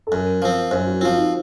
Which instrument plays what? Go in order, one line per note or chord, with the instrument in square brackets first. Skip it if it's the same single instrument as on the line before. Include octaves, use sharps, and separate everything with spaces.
[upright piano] A4
[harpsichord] F#2 [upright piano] A#4
[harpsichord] F3 C4
[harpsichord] F#2 [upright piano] C5
[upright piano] F#4
[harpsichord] F3 C4 [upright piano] F4
[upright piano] D#4